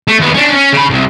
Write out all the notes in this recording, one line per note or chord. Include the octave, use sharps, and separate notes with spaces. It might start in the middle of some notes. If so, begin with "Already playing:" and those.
A3
D#2 B3
C#4 D4
C#4
C#3 B5
C2